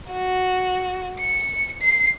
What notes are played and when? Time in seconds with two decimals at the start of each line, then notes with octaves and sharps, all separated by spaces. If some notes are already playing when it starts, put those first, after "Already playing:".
0.12 F#4
1.19 C#7
1.82 C7